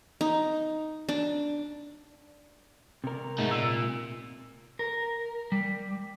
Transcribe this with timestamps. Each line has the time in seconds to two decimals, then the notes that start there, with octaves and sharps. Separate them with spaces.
0.21 D#4
1.09 D4
3.04 C3 A#4
3.38 G#2 A3 D#4
3.51 A#2 E6
4.79 A#4
5.52 G3